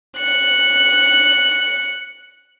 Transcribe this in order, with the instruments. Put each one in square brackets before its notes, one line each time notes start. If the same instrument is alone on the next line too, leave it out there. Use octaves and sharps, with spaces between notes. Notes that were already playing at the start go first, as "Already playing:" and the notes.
[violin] F#6 C#7